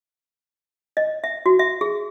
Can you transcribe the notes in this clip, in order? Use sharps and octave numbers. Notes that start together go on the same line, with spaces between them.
D#5
E5
F#4
E5
G#4